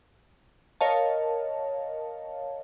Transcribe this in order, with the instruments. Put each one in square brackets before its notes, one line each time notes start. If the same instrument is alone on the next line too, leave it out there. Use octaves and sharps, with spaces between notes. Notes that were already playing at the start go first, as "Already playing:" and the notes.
[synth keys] A#4 C#5 D#5 F5 A5